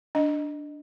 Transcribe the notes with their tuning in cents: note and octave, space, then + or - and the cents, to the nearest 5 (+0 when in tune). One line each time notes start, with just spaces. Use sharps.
D4 +0 D#5 -10